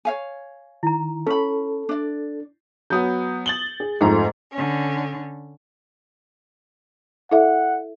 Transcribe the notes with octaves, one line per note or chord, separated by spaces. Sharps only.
C#5 F5 G#5
D#3 E4 A#5
C#4 A4 B5
D4 D5
F#3 B3 D#6 G6
A6 F#7 G7
G#4
F2 G#2 A3 A#5
D3 C#4
E4 A4 E5 F#5